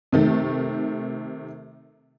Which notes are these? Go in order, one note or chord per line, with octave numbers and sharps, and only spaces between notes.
C3 D#3 A3